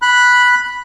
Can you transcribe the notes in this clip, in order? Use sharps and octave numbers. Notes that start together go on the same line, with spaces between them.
B5 F#6